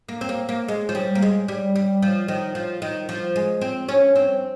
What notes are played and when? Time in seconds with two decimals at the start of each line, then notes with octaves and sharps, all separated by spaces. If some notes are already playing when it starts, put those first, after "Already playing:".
0.09 A#3
0.21 C4
0.29 A#3
0.49 A#3
0.68 G#3
0.89 F3
0.95 G3
1.15 A#3
1.22 G#3
1.48 G3
1.76 G3
2.03 F3
2.28 D#3
2.55 F3
2.82 D#3
3.09 F3
3.36 G#3
3.61 C4
3.89 C#4
4.16 C4